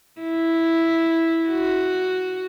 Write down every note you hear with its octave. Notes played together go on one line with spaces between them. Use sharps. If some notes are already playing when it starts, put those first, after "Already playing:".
E4
F#4